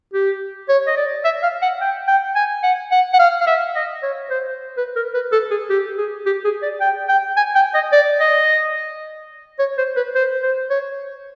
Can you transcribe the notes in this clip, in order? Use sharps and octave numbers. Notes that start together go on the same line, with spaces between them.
G4
C#5
D#5
D5
E5
F5
F#5
G5
G5
G#5
F#5
F#5
F#5
F5
F5
E5
D#5
C#5
C5
B4
A#4
B4
A4
G#4
G4
G#4
G4
G#4
D5
G5
G5
G#5
G5
D#5
D5
D#5
C#5
C5
B4
C5
C5
C#5